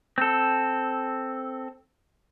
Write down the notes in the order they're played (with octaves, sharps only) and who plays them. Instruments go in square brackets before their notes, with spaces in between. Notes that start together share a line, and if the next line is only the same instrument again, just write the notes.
[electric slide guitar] C4 A4